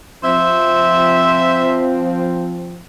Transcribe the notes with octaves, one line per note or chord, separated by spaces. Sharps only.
F3 C4 C5 E5